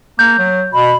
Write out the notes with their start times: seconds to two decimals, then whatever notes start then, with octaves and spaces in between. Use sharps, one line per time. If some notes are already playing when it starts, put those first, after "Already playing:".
0.19 A#3 G6
0.39 F#3
0.73 B2 B5